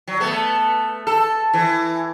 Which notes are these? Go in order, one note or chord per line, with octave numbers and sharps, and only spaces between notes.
F#3
A3 B3
A4
E3